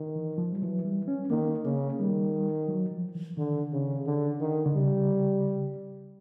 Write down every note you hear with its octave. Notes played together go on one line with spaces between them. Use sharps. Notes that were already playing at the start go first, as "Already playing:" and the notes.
Already playing: D#3
E3
F3
G3
E3 F#3
G3
C#4
D#3 A#3
C#3 A#3
D#3 G3
F#3
F3
E3
D3 D#3
C#3
D3
D#3
D3
C#3 G3